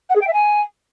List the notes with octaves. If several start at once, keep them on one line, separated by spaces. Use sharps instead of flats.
F#5
G#4
G5
E5
G#5